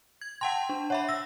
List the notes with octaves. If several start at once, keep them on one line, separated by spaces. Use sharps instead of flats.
G#6
F#5 G5 A5 C6
D4
C#5 E5 F#5 B5
E6 A#6